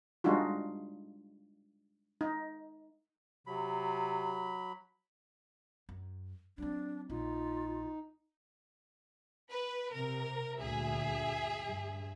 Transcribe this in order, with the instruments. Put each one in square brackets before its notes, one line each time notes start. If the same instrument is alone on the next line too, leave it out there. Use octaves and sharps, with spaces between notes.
[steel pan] G3 G#3 D4 D#4 F4 F#4
D#4
[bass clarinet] C3 [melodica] F#3 B5
[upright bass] F#2
[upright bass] F#3 C4 [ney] D4
[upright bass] A#1 [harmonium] D#4 [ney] F4
[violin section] B4
[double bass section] C3 [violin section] A#4
[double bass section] D2 G2 A#2 [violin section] G#4 E5
[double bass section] G2